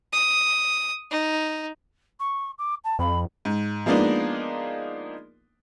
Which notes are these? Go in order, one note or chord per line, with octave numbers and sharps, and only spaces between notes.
D#6
D#4
C#6
D6
A5
F2 B5
G#2
F3 G#3 A#3 B3 D4 D#4